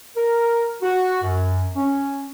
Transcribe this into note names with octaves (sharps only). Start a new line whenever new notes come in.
A#4
F#4
F#2
C#4